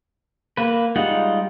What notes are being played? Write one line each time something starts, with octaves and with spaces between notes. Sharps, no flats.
A#3 B4
G3 G#3 D#4 F4 F#5